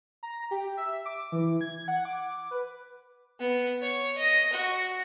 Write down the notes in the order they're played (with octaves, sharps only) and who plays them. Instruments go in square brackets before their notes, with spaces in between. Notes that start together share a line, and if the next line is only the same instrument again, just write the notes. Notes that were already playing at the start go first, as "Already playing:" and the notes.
[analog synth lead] A#5
G4
E5
D6
E3
G#6
F#5
D6
B4
[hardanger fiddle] B3
C#5
D#5
F#4